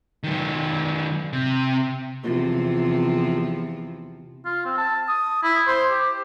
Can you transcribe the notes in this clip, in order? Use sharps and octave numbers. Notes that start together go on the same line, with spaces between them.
D#3 F#3
C3
E2 C3 F3
F4
C4
A5
D#6
E4
C5
G4